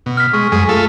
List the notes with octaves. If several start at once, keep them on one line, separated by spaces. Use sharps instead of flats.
B2
F6 B6
G#3 C#6
F#2 G#3 G#4
A3 F4 A4